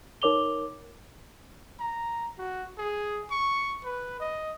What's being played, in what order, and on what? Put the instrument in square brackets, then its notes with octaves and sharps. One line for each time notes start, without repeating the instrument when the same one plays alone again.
[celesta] D#4 A#4 C#5 D6 F7 G7
[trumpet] A#5
F#4
G#4
C#6
B4
D#5